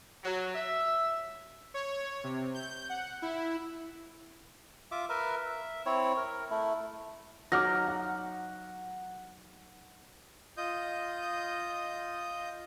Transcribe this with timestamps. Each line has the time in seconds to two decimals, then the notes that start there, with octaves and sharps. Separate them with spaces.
0.24 F#3
0.54 E5
1.74 C#5
2.24 C3
2.55 G6
2.89 F#5
3.22 E4
4.91 F4 E5 D6
5.09 A#4 B4 E5
5.46 E5
5.86 C4 E4 C#5
6.17 A#4
6.51 A3 E4
7.52 F#3 D#4 D6 F6 A#6
7.88 F#5
10.57 F4 D#5 D#6 G6